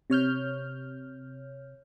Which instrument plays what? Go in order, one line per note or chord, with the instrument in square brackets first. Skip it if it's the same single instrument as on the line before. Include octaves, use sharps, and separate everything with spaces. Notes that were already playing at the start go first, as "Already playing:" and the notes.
[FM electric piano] C3 C#5 F6 G6